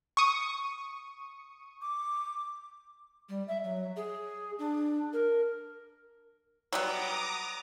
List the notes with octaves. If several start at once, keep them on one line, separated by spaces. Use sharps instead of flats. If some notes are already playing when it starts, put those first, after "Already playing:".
C#6 D#6
D6
G3
E5
F#3
G#4
D4
A#4
F#3 G3 B3 A#5 D6 D#6